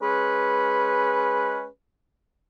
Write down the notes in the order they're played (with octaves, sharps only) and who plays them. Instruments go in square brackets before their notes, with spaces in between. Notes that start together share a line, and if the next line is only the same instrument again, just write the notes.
[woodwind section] G#3 C#4 B4